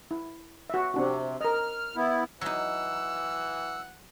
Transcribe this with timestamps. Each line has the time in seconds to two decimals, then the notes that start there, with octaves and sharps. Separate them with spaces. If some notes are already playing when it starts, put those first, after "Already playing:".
0.11 E4
0.70 F#4 E5
0.94 C3 C4 D4 F#4
1.41 A#4 D#5 F6
1.96 B3 E4
2.41 E3 F#3 D#4 F#5 E6